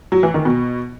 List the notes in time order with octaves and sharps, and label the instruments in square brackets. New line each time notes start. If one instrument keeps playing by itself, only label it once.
[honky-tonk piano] F#3
E3
D#3
B2